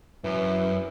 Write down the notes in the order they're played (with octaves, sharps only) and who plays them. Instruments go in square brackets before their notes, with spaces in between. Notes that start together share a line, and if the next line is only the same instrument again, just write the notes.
[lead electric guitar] F#2 [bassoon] E3